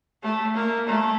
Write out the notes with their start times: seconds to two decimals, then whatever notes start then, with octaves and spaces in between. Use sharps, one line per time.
0.23 A3
0.55 A#3
0.87 A3